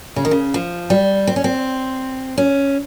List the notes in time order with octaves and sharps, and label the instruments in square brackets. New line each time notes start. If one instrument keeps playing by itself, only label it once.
[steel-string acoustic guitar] C#3
D#3
C#3
F3
G3
C4
C#4
C4
C#4